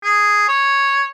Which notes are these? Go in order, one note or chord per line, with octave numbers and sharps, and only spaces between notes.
G#4
C#5